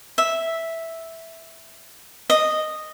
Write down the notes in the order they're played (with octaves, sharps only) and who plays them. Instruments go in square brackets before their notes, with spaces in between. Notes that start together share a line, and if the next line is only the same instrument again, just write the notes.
[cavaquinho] E5
D#5